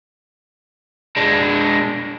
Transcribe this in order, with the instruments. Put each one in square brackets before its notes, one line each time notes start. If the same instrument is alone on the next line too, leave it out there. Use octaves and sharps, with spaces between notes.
[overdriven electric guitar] G#3 D4